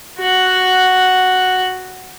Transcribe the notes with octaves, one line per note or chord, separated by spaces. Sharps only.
F#4 F#5